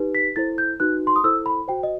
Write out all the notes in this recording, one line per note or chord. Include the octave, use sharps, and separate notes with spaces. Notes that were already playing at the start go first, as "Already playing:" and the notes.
Already playing: D#4 G4 B4
B6
E4 A4 C5 A6
G6
D#4 F#4 B4 F#6
C6
D#6
E4 A4 C5 E6
B5
F#4 C5 G5
D#5